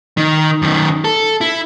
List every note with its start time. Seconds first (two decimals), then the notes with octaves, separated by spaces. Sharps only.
0.17 D#3
0.62 F#2 D#3
1.04 A4
1.41 E4